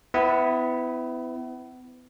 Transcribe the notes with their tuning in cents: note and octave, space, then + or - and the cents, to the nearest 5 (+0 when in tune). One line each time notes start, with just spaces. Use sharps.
B3 +35 E4 +0